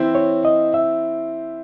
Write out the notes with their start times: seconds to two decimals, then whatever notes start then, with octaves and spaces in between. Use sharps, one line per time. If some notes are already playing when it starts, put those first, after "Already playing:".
Already playing: E3 C4 E4 C5
0.15 C#5
0.45 D#5
0.74 E5